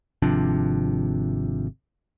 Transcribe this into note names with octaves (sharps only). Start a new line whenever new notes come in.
G#1 C3 F3 D4